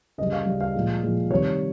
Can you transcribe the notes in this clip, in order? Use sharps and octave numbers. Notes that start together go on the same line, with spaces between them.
C#3 G3 D#5
F5
C#3 G3
F5
A#2 F3 G#3
A#2 F3 G#3
C3 D#3 G3 C#5